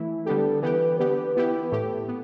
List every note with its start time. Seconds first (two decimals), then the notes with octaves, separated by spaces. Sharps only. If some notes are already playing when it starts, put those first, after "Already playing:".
Already playing: E3 A3 E4
0.26 D3 G3 B3 D4 G4 A4
0.62 E3 B3 G4 B4
0.99 D3 B3 G4 B4
1.36 E3 B3 E4 G4 B4
1.72 A2 A3 G4 A4
2.08 B3